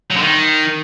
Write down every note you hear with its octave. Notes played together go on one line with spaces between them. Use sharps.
F#3
D3
D#3